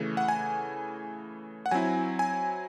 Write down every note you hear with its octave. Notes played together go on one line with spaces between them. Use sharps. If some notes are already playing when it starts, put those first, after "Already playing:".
Already playing: C#3 E3 A3
F#5
G#5
F#5
F#3 C4 E4 G#5
G#5